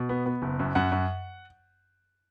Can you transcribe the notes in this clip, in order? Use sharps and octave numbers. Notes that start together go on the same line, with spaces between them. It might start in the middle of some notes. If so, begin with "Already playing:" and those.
Already playing: B2
B3
B3
F#1
F#2
F#2 F#5
F#2